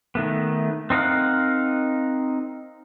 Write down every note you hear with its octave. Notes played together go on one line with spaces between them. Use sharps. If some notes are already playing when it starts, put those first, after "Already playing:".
D#3 A3 B3
C4 D#4 A#4 F5 F#5